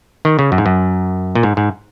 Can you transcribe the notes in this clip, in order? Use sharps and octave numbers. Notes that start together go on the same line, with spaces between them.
D#3
C#3
F#2
G#2
F#2
A#2
G#2
G#2